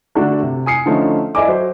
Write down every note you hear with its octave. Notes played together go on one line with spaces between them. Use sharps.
D3 A3 D4 F#4 A4
C3
G#5 D#6 C7 C#7
D3 F3 A3 C#4 D#4
E4 A4 D5 D#5 G#5 D6
F#3 C5